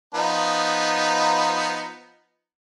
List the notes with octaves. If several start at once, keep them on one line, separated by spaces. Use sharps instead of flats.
F3 B3 D#4